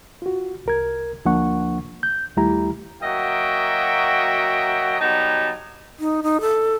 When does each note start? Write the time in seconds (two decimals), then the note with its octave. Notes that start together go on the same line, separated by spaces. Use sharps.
0.22 F4 F#4
0.66 C2 A#4 G#6
1.25 D2 F3 A#3 D4 F#5 C#6
2.03 G6
2.37 D#2 G3 A3 E4 G4 A#5
3.03 F#3 A#3 F#4 D#5 E5 G5
5.00 F#3 G3 B3 D#4 G4 A5
5.99 D#4
6.23 D#4
6.41 A4